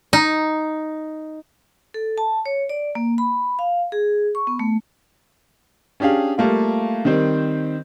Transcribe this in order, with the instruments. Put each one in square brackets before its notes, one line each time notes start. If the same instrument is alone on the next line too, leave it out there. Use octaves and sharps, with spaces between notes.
[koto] D#4
[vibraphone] A4
A5
C#5
D5
A#3
B5
F5
G#4
C#6
B3
A3
[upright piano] C#4 D4 G4 G#4 F5
G3 A3 A#3 F4
D#3 G3 C4 C5